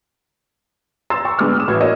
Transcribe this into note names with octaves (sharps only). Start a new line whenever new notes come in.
A#5 C6 E6 A6 E7
G5 C#6
D3 G#3 B3 D6 F6
D#6 E7
A1 A2 E3 F#4 G#6
A#3 D4 C#5 D#5 E7